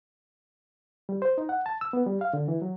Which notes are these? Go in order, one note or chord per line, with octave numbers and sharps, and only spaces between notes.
G3
C5
D#4
F#5
A5
E6
B3
G3
F5
D3
E3
F#3